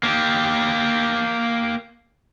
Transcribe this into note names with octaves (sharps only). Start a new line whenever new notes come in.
A#3 G4